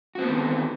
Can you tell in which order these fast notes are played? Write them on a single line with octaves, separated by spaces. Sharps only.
F#4 C4 B3 D3 D#3